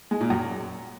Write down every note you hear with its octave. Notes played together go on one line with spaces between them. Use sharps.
G#3
A#2
F#2